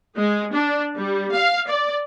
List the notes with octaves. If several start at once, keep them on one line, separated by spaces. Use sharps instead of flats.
G#3
D4
G3
F5
D5